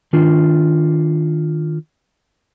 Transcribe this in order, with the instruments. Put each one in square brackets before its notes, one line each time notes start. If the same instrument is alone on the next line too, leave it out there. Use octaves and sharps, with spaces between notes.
[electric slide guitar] D#3 D4 F4